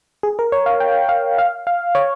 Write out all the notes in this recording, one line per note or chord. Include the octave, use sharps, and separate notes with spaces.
G#4
A#4
C#5
F5
G5
F5
F5
F5
C#5